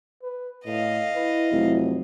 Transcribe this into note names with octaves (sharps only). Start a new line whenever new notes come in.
B4
A2 D#5 F5
E4 B4
F1 F#3